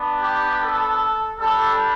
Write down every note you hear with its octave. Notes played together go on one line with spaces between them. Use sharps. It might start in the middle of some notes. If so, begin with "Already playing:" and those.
Already playing: B3 D4
G4
A4
G3 D4 G4 A4